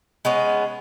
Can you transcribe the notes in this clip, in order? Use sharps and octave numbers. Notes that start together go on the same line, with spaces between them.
G#3 B3 C#4